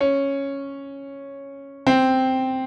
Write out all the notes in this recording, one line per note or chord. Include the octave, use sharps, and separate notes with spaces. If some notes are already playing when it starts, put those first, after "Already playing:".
C#4
C4